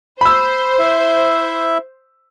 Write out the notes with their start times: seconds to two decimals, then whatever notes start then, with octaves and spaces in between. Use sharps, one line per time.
0.21 C5 B5 E6
0.79 E4 E5